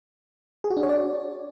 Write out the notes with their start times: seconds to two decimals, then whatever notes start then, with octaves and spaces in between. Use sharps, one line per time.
0.64 G#4
0.70 F#4
0.77 D4
0.83 C#5
0.89 D5